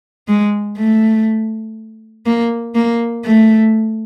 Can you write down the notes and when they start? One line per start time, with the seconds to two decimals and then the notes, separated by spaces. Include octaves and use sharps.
0.28 G#3
0.77 A3
2.26 A#3
2.75 A#3
3.25 A3